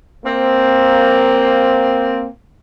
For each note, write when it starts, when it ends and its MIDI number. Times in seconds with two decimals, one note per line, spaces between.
0.25 2.27 58
0.25 2.27 60